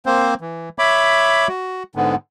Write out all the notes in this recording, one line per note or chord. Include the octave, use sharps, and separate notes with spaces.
A#3 C4 C5
E3
C#5 E5 B5 D6
F#4
G#2 D3 B3